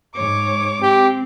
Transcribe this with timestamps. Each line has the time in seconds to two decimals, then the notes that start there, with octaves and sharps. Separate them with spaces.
0.16 G#2 C#5 D6
0.82 C4 G4